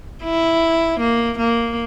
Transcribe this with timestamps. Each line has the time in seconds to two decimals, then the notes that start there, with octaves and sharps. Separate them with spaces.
0.24 E4
0.99 A#3
1.38 A#3